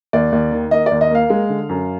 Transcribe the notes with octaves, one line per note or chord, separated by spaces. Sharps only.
D#2 D5
D#2
D#3
A#3 D#5
D5
D#2
D#5
A#3 F5
G#3
D3
F#2